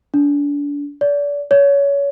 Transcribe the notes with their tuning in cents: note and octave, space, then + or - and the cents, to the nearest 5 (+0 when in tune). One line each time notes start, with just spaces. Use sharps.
D4 -30
D5 -30
C#5 +25